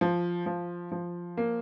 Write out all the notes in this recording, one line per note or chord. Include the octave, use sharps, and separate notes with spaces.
F3
F3
F3
A#3